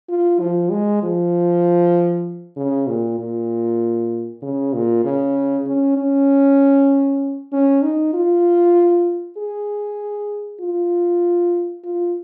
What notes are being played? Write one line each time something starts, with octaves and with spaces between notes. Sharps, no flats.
F4
F3
G#3
F3
C#3
A#2
A#2
C#3
A#2
C#3
C#4
C#4
C#4
D#4
F4
G#4
F4
F4